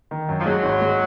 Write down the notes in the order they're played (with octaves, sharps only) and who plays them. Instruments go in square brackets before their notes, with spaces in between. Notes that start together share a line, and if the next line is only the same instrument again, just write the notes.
[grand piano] D#3
F#2
[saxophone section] F3
[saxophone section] F#3 [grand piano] G#3
[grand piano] G#1
G#3